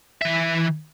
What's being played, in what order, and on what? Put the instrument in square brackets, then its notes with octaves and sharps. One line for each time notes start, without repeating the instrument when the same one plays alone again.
[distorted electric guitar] E3 E5